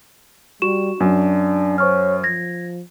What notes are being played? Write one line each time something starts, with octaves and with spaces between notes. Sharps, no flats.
G3 F#4 C#6 E7
F#2 D4
C5 C#5 C#6 F6
F3 G#6 A#6